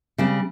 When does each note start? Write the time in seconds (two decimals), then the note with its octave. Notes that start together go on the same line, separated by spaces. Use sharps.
0.18 C#3 G3 C4